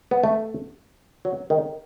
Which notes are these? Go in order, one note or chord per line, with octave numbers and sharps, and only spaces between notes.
B3
A3
F#3
D#3